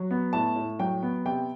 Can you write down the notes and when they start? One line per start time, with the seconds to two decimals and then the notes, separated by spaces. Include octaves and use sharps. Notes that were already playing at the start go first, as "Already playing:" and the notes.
Already playing: F#3
0.11 B3
0.33 A2 A5
0.56 A2
0.79 F#3 G5
1.03 B3
1.25 C3 G5